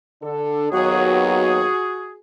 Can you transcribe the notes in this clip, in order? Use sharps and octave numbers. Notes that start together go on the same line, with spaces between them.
D3 D4 A4
D#2 F#3 B3 F#4 G#4